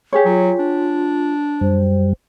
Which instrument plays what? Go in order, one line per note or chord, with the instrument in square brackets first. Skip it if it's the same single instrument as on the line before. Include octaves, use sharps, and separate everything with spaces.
[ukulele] G4 G#4 C#5
[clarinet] F#3 [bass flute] F4
[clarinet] D4
[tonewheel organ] F#2 G3 [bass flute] C5